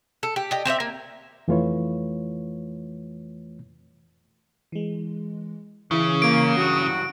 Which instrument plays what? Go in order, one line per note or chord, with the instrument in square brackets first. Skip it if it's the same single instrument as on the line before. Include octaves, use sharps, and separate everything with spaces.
[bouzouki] A4
G4
G4 D#5
C4 G4 C5 E5
A#3
[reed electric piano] F2 E3 A3 F4 B4 C#5
[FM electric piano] E3 G#3
[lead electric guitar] C#3 [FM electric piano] E3 E4 G#4
[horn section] A#3 [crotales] D7
[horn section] G2 F#3 F#4